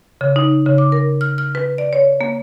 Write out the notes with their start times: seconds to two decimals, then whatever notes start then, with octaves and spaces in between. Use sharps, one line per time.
0.21 C#3
0.36 D#4
0.66 C#3
0.78 D6
0.92 A#4
1.21 F6
1.38 F6
1.55 B4
1.78 D5
1.93 C#5
2.21 A#3